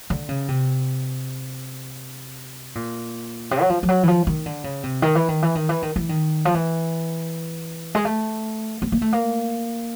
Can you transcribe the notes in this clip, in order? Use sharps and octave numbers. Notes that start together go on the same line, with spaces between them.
D3
C#3
C3
A#2
C3
F#3
F3
F3
F#3
E3
F3
D#3
D3
C#3
C3
D#3
E3
D#3
E3
D#3
E3
D#3
E3
D#3
F3
E3
G#3
A3
B3
A#3
A3
A#3